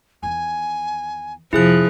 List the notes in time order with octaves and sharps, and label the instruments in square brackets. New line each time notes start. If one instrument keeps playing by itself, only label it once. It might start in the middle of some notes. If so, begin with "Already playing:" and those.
[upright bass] E2 D#3 [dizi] G#5
[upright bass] F2 C3 [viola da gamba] F3 [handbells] E4 G#4 F#6